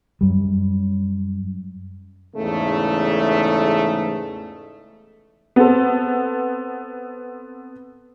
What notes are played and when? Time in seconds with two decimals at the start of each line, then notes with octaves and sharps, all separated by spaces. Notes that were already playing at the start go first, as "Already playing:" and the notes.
0.21 F#2 G3
2.36 E2 G#2 C#3 A3
5.56 B3 C4 A4